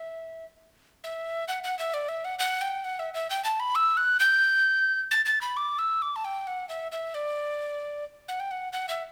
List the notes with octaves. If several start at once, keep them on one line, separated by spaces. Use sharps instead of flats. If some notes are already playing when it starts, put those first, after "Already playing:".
Already playing: E5
E5
F#5
F#5
E5
D5
E5
F#5
F#5
G5
F#5
E5
E5
G5
A5
B5
E6
F#6
G6
A6
A6
B5
D6
E6
D6
A5
G5
F#5
E5
E5
D5
F#5
G5
F#5
F#5
E5